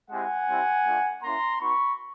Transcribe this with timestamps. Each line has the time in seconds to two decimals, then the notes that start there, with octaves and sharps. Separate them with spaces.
0.10 G#3 C4 E4 G4 F#5 G#5
0.48 G3 C4 E4 G4
0.85 A3 D4 F4
1.22 A#3 C#4 E4 A#5 C6
1.59 B3 D#4 F#4 B5 C#6